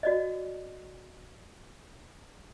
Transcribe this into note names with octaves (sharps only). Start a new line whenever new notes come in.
F#4 D5 D#5